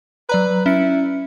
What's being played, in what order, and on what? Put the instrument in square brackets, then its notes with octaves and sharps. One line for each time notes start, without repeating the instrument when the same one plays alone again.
[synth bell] F#3 D5 A#5 [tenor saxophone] B4
[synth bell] C#4 C#7 [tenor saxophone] E4